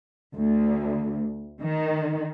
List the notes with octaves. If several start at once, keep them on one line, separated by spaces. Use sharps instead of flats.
D2
D#3